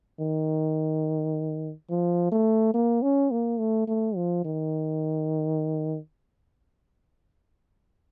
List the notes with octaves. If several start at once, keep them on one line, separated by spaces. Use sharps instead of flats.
D#3
F3
A3
A#3
C#4
A#3
A3
A3
F3
D#3